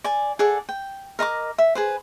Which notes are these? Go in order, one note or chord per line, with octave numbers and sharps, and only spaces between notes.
D5 G#5
G#4 A4 D5 F#5
G5
A#4 D#5 A#5 D6
E5
G#4 B4 C5